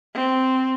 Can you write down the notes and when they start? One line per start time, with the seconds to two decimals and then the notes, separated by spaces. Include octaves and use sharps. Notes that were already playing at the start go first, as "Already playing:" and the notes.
0.15 C4